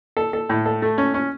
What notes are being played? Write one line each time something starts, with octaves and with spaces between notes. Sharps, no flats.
A4
A4
A2
A4
A3
C#4
C#4